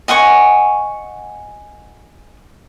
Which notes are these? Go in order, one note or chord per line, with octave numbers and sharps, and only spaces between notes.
D#5 F#5 G#5 C#6